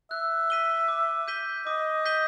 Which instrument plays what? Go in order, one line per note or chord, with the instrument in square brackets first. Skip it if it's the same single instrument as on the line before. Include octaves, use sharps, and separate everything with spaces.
[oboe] E5 [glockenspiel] F#6
[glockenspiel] B6 D#7 G7
D6
G6 B6 D#7 G7
[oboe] D#5 [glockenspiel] D6
[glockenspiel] G6 B6 D#7 G7